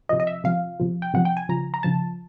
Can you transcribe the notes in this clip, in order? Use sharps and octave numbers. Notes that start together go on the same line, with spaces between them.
C3 F3 D#5
D#5
E5
C3 F3 F5
C3 F3
G5
C3 F3 F#5
G5
G#5
C#3 F3 A#5
A#5
C#3 F3 A5